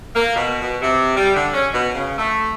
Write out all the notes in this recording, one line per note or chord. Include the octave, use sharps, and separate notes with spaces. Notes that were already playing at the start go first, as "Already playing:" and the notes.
A#3
B2
B2
C3
G3
D3
C#4
B2
C#3
A3